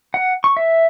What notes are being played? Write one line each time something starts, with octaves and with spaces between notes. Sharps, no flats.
F#5
C#6
E5